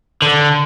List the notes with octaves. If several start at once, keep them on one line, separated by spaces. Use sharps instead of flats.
D3